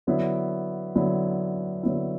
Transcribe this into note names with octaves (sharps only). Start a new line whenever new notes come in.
D3 F#3 B3 E4
D3 F#3 B3 E4
D3 F#3 B3 E4